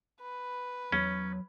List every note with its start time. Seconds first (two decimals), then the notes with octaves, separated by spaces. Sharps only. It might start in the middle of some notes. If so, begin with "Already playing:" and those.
0.21 B4
0.92 E2 F#3 C#4